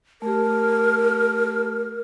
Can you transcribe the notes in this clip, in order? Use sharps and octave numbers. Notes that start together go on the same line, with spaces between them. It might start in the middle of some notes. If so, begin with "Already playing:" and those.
A3 G4 A#4